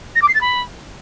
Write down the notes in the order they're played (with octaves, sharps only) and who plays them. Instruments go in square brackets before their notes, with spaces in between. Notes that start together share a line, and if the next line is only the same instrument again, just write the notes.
[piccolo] A#6
D6
C7
A6
B5